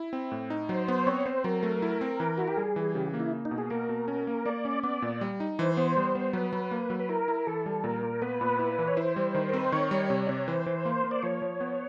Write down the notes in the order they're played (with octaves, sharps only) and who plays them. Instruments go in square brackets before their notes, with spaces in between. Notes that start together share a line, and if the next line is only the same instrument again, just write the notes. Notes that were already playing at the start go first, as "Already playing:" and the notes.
Already playing: [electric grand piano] E4
C4
A2
D#4
[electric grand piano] F#3 [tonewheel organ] C5
[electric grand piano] B3
[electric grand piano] C4 [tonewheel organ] C#5
[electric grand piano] C4 [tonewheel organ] C5
[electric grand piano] F#3 [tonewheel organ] A#4
[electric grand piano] A3
E4
C4
E3
[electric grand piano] E4 [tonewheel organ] F#4
[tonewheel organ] G4
[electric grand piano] G3 [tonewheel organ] G#4
[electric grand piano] E3
[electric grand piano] C#3 [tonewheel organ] G4
[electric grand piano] A#3
[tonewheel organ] E4
[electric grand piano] A#3
[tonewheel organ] D#4
[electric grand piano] B2
[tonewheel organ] G#4
[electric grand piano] A#3 [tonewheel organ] A#4
[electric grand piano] B2
C#4
A#3
[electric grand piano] A#3 [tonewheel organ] D5
[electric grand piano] C#4
[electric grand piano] B3 [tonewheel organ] D5
[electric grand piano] A#2
G3
D#4
[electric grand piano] E3 [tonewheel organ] C5
[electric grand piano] B3
G3
B3
[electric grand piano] F#3 [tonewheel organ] B4
[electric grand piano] F#3
A#3
F#3
[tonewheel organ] B4
[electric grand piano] E4 [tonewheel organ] A#4
[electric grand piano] E4
[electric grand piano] E3 [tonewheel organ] A4
[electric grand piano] G3
[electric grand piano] A#2 [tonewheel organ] A#4
[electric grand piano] A#2
[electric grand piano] B3 [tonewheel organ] B4
[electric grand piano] A#2
E4
E3
[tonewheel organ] C#5
[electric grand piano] E4 [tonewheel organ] C5
[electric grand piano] G3
D#3
[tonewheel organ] A#4
[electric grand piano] C4 [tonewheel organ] B4
[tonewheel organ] C5
[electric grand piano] D#3 [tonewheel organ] C#5
[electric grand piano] G3
C3
[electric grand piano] C3 [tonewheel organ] D5
[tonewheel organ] C#5
[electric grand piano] E3 [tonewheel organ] C5
[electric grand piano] E3
A#3
A#3
[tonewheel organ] D5
[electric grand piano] F3 [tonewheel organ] C#5
[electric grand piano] F3
B3